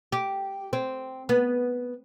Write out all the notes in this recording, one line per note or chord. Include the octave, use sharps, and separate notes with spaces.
G4
C4
B3